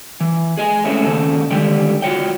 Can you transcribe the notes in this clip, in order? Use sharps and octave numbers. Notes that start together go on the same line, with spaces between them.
E3
G#4 D#5 G#5
G#3 A3 C4 C#4 E4
D#2 C#3 A4
D3 D#3 G3 G#3 G4
F4 F#4 C#5 G5